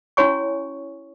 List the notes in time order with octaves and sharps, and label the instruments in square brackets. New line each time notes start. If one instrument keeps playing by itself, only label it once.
[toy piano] C#4 E4 F#4 C#5 G#5 C#6